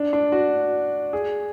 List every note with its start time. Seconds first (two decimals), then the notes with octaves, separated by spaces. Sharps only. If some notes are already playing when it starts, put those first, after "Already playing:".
Already playing: D4
0.13 D4
0.32 F#4
1.13 G#4